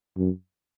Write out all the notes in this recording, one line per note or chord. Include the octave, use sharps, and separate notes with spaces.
F#2